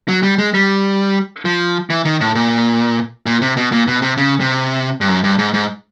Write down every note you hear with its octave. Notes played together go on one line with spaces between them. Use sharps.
F#3
G3
G#3
G3
F3
E3
D#3
A2
A#2
A#2
C3
B2
A#2
B2
C3
C#3
C3
G2
F#2
G2
G#2
G#2